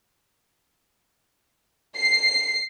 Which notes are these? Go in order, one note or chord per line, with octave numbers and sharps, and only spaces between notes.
C7